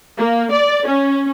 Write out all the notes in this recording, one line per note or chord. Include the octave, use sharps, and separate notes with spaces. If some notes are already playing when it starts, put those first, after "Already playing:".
A#3
D5
C#4